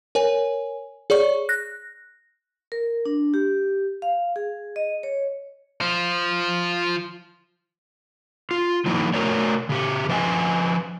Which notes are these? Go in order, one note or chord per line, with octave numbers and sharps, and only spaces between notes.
A#4 C#5 G#5
G#4 C#5 D5 C#6
F#6 A#6
A#4
D4
G4
F5
G#4
D#5
C#5
F3 F4
F4
F3 G3 A#3 D#4 E4
A3 F#4 A#4 C#5 D5
C#3 G4
F3 B4 D#5 F#5 G#5